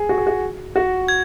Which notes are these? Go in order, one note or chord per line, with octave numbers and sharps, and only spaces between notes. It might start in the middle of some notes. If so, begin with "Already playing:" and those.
Already playing: G#4
F#4
G#4
F#4
F#4
G#6